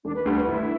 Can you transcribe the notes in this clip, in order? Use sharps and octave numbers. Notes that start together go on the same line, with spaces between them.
E1 D4
B4
D2 D3 G3
B4
G1 E4